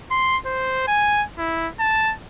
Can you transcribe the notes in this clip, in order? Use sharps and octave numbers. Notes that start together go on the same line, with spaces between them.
C6
C5
G#5
E4
A5